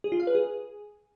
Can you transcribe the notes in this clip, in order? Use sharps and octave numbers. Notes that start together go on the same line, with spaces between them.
G#4
F4
F5
B4
G#4